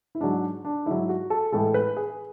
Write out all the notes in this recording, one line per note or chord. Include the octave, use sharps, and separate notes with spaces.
E4
G#2 F#3 D4
D4
G#2 F#3 E4
F#4
A4
A2 E3 G#3 A4
B4
G#4